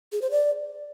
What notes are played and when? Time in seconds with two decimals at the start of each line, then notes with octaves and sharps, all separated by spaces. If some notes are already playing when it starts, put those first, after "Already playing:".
0.12 G#4
0.22 C5
0.31 D5